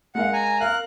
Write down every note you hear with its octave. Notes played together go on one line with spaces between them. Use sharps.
G#3 A#4 F5 F#5
G#5 A#5
A#4 F5 F#6